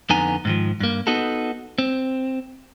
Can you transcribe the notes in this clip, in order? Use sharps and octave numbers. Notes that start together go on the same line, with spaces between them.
F2 D3 B3 D#4 G#5 A#5
G#2 D#3 F3
G2 A#3
B3 D#4 F#4 A4
C4